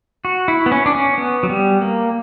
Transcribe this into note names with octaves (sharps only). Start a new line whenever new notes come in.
F#4
E4
B3
C#4
D4
C#4
B3
F#3
G3
A#3